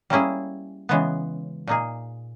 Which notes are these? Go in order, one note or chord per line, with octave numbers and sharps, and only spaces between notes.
G3 A#3 C#4 E4 G#4
C#3 E3 G#3 B3
A#2 A#3 D#4 G#4